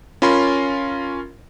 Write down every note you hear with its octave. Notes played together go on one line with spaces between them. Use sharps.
C#4 F4 A#4 B5 C6